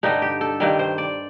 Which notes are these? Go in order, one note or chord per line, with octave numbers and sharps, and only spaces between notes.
G2 D3 G3 D#4
G4
A4
G2 D#3 G3
C5
D5